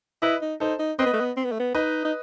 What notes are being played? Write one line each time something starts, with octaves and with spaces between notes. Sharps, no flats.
E4 B4 D#5
D#4
D#4 A4 C5
D#4
C4 B4 D#5
B3
A3
B3
C4
B3
A3
B3
D#4 B4 D#5
D#4